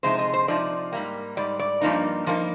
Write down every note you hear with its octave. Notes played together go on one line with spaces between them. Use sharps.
C3 F3 G#3 D#4 C5
D#5
C5
C3 F3 D#4 D5
G#2 G3 A#3
G#2 G3 D5
D5
G2 F3 A#3 D#4
G2 F3 A#3 D#4